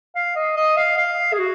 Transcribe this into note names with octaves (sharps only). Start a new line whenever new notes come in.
F5
D#5
D#5
F5
F5
G#4
F#4